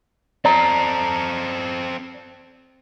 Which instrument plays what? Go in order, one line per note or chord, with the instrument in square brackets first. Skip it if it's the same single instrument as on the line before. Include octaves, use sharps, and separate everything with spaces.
[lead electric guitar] C4 A4 [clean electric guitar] D5 A#5